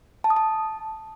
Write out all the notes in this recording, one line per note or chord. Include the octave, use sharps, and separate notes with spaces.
A5
D#6
A5